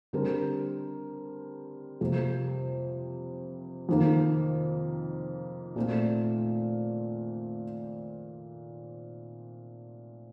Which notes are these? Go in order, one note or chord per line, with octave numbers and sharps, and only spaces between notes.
D3 G3 C4 G4 A#4
F2 C3 G3 A#3
F2 D#3 A#3
A#2 A3 C4